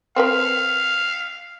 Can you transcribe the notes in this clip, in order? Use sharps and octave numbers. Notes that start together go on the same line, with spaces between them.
C4 A#4 B4 F5